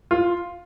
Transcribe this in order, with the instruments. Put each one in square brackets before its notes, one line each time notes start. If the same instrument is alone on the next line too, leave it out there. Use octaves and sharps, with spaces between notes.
[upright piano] F4